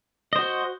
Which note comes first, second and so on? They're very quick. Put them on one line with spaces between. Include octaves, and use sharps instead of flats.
D#5 C5 F#4